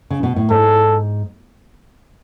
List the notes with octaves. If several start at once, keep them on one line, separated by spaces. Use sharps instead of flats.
C#3
B2
A2
G#2 A4